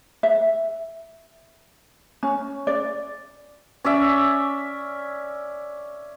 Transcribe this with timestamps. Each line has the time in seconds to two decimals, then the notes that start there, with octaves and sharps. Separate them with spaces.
0.23 E5
2.23 C#4
2.67 D5
3.84 C#4 D5 E5